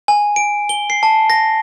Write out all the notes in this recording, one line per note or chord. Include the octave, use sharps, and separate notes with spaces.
G#5
D7
G7
C7
A5
A#6